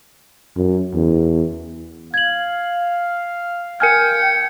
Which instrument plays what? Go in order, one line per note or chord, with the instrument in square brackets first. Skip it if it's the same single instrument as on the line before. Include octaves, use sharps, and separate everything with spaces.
[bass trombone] F#2
E2
[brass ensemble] F5 [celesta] G#6 F#7
[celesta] A#4 G#5 F6 [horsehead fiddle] G5 [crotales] G#6 C#7